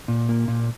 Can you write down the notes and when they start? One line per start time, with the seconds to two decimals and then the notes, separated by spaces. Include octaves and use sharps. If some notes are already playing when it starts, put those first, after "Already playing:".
0.08 A#2
0.29 A#3
0.48 A#2